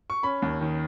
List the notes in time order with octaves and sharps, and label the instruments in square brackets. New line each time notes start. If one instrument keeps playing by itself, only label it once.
[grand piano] C#6
C#4 B5
D#2
D#3